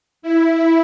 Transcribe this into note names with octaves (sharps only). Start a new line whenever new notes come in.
E4